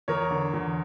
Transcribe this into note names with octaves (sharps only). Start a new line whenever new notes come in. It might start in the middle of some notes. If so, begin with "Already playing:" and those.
E2 A#4 C#5
D3
E2